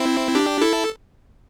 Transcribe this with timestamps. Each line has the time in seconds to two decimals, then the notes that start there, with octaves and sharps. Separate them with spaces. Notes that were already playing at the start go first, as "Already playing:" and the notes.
Already playing: C4 E4
0.35 D4 G4
0.61 E4 A4